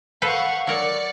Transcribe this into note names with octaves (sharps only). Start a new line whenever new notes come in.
A4 B4 C5 F5 F#5 C#6
F#3 A#4 C#5 D5 C#7